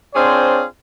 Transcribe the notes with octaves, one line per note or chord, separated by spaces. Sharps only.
C4 D4 F4 G#4 C5 C#5